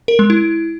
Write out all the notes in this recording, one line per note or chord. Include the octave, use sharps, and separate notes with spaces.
A#4
G#3
E4